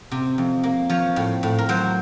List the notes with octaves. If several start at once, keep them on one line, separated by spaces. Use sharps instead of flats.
C3
F2
A#3
F3 C#5
A2
A2
A#4
F#3 C5